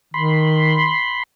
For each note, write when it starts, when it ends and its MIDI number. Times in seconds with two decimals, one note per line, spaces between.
0.14 0.93 51
0.14 1.23 83
0.14 1.23 84